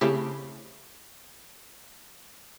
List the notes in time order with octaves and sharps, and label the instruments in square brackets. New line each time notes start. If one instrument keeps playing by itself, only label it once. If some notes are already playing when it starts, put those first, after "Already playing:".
[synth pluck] C#3 A3 C4 E4 G4